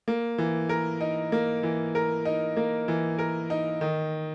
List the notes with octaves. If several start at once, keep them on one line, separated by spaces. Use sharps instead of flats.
A#3
E3
A#4
D#4
A#3
E3
A#4
D#4
A#3
E3
A#4
D#4
D#3